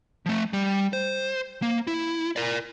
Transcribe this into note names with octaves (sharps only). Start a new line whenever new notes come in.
F3 A3
G3
C5
A#3
E4
A#4 D5